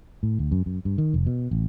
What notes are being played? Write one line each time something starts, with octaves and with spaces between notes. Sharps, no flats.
A2
D2
F#2
F#2
G2
D#3
F1
B2
A1